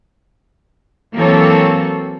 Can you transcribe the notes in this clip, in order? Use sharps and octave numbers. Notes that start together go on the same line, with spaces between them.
E3 F#3 A#3 C4 A4 C#5